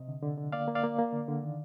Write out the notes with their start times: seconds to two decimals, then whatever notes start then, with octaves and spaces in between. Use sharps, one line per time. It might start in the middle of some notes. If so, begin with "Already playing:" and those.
Already playing: C3 D#5
0.08 D3
0.23 D3
0.38 D3
0.52 A#3 D5 F5
0.68 A#3
0.75 D5 F5
0.84 A#3
0.98 A#3
1.13 D3
1.28 D3
1.43 D#3